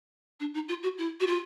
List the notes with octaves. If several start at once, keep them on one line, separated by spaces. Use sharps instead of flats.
D4
D#4
F4
F#4
E4
F#4
F4